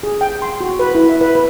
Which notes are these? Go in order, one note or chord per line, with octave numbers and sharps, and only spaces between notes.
G#4
G5
C6
F#4
B4
E4
E5
B4
B4